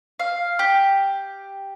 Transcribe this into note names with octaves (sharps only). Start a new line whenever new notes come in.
F5
G4